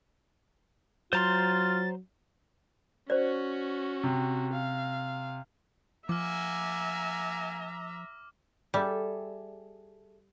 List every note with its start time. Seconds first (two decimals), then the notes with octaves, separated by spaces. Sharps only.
1.13 F#3 F4 C5 A#5 C6 A6
3.10 C#4 F#4 C5 D5
4.03 C3
4.53 F5
6.09 F3 A#3 E5 F#5 G#5 A#5 D6 F6
8.74 G3 G#4 A4 E5